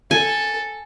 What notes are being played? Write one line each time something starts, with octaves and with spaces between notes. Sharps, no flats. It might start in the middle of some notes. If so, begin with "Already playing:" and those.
A4 G#5